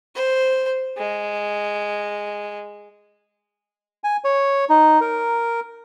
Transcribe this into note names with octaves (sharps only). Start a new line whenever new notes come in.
C5
G#3
G#5
C#5
D#4
A#4